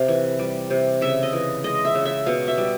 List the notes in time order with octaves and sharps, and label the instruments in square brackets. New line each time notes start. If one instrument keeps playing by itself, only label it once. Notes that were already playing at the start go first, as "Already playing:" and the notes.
Already playing: [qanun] C3 F5
E3
G3
C3
C#3 E5
D#5
E3
G#3 D#5
E5
C#3
E5
B2 F5
E5
G3